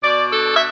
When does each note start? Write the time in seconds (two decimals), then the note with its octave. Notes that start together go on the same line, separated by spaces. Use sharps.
0.03 B2 D5
0.31 D4 A4
0.54 E5